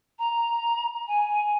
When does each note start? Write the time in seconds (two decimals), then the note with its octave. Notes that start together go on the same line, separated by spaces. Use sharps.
0.19 A#5
1.07 G#5